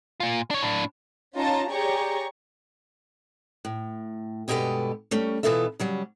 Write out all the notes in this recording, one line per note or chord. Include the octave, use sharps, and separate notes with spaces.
A#2 F4
D4 C#5
A2 D4
C#4 D#4 F4 C#5 A5 A#5
G4 G#4 C#5 D5 A#5 C#6
A2
G2 B2 G#3 G4 A4 B4
G3 A3 C#4
B2 E3 B3 F4 A4 E5
C#3 F#3 G3